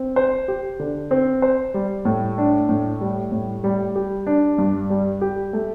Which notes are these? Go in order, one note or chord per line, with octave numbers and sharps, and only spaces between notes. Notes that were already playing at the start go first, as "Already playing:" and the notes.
Already playing: C4
C5
G4
D3
C4
C5
G3
A2
D4
A2
G3
A2
G3
G4
D4
G2
G3
G4
A3